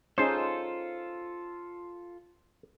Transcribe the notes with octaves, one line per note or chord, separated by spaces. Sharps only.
C#4 D#4 F4 G#4 A4 C5